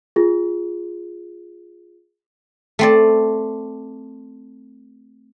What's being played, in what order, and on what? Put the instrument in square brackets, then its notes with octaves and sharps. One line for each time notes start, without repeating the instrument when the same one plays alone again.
[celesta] F4 G#4
[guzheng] A3 C4 D5